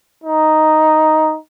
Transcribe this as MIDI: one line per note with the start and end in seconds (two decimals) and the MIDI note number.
0.24 1.37 63